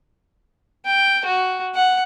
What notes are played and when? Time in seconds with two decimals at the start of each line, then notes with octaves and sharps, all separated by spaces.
0.85 G5
1.25 F#4
1.75 F#5